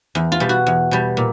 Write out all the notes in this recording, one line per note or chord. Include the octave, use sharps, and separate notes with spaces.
E2
F4
B2 G3
F#4
E2
B2 G3
A#2